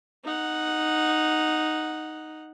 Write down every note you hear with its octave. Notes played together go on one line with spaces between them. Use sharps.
D#4 F#5